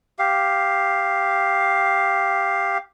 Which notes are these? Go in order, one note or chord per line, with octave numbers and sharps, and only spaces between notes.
G4 F5